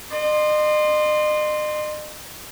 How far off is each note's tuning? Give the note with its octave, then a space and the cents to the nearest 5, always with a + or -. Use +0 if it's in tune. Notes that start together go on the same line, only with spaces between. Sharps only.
D#5 -40 C6 +0